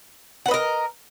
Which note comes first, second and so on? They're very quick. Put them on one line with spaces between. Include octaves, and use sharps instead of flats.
F#5 B4 D#5 A#4